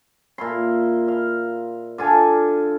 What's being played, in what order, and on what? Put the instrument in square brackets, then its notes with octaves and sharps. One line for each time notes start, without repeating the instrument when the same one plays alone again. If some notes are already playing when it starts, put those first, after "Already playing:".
[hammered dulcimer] A#2 E4 C6
F5 C6
D3 F4 G#5 A5